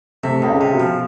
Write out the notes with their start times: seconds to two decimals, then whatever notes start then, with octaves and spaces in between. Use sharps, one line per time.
0.23 C3 A3
0.42 C#2
0.49 C#3
0.61 C3
0.73 B2
0.80 F3